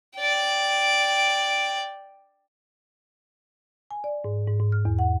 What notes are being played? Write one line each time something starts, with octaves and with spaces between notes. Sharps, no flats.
D5 G5
G#5
D5
G#2
G#2
G#2
F6
E2
F#5